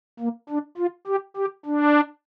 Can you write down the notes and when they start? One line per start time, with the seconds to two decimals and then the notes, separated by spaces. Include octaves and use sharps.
0.20 A#3
0.50 D4
0.78 F4
1.07 G4
1.36 G4
1.66 D4